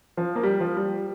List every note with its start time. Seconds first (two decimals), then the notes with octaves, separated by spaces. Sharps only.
0.17 F3
0.36 A#3
0.43 G3
0.60 F3
0.77 G3